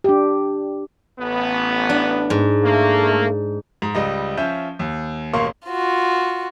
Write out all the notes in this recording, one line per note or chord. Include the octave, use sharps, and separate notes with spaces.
D4 G4
A1 B3
D4
G#2
A3 A#3
G#2
C#2 G3 D#5
F3 C#4 E5 G6
D#2
E1 A1 A#3 F5 C6 C#6
F4 F#4